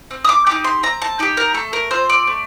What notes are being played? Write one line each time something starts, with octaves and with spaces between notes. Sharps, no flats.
C4
D#6
D6
D#4 G4 D6
C6
C4 A#5
A5
D#4 G4 G5
A#4
A3 A4
A#4
C4 F4 C5
D5
A3